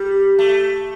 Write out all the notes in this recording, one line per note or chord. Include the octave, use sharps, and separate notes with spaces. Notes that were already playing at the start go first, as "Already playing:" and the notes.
Already playing: G3
A3